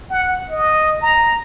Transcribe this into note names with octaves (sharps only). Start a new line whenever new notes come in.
F#5
D#5
A#5